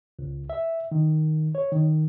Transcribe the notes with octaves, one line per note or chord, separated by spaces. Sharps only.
C#2
E5
D#3
C#5
D#3